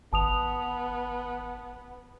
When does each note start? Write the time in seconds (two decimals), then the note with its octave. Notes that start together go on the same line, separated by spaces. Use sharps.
0.13 G#1 B3 A5 D#6 F7